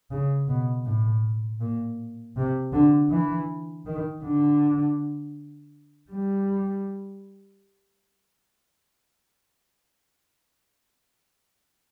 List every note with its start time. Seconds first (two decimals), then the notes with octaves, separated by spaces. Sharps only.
0.11 C#3
0.48 B2
0.85 A2
1.61 A#2
2.36 C3
2.73 D3
3.10 E3
3.86 D#3
4.23 D3
6.11 G3